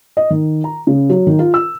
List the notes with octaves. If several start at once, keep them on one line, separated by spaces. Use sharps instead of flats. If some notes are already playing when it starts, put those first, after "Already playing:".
D#5
D#3
A#5
C#3
F#3
D#3
F4
E6